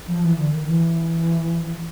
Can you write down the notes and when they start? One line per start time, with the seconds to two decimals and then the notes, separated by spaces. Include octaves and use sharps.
0.07 F3
0.22 E3
0.36 D3
0.50 D#3
0.66 E3